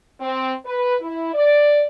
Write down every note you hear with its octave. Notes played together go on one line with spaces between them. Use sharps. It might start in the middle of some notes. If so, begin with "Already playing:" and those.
C4
B4
E4
D5